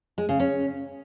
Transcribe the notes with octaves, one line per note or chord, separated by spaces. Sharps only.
G#3
C#3
C#4